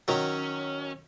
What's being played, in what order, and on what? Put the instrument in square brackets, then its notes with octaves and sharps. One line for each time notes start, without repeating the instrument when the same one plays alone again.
[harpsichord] D#3 F#3 [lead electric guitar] C#4